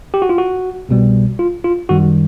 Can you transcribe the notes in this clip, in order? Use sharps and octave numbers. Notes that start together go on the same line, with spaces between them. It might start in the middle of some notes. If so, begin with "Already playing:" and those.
G4
F#4
F4
F#4
C2 B2 G3
F4
F4
F#2 D#3 G3 F#4